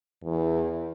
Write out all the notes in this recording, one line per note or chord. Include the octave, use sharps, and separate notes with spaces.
E2